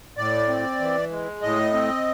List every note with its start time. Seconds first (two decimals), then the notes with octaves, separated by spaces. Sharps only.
0.17 A2 D5
0.48 C4
0.80 E3
1.11 G#3
1.42 A2 D#5
1.73 C4